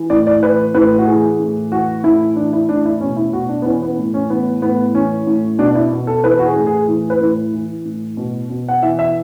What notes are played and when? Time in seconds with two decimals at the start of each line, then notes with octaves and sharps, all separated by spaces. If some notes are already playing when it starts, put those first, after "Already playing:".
Already playing: E3
0.10 A2 D5
0.27 D5
0.42 E3 B4
0.74 A2 B4
0.98 F#4
1.07 E3 G#4
1.40 A2
1.71 E3 F#4
2.04 A2 E4
2.36 E3 D4
2.53 E4
2.69 A2 D4
2.85 E4
3.01 B2 C#4
3.16 E4
3.33 B2 F#4
3.49 D4
3.62 B3
3.65 E3 C#4
3.82 B3
3.98 A2
4.14 C#4
4.30 E3 B3
4.62 A2 B3
4.94 E3 C#4
5.27 A2
5.59 B2 D4
5.71 D4
5.75 E4
5.91 B2
6.07 A4
6.24 E3 B4
6.39 F#4
6.46 G#4
6.56 A2
6.67 G#4
6.88 E3
7.10 B4
7.21 A2
7.53 E3
7.85 A2
8.17 B2
8.50 B2
8.68 F#5
8.83 E3 E5
8.99 E5